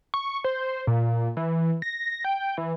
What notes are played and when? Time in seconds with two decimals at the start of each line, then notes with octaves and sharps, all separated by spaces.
0.14 C#6
0.44 C5
0.87 A#2
1.37 E3
1.82 A#6
2.24 G5
2.58 E3